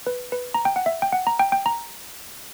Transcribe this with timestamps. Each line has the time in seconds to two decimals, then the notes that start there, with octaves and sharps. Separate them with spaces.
0.07 B4
0.32 B4
0.54 A#5
0.65 G5
0.76 F#5
0.86 E5
1.02 G5
1.12 F#5
1.27 A#5
1.39 G5
1.52 G5
1.66 A#5